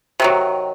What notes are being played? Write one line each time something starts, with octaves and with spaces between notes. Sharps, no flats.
C3 D#3 F#3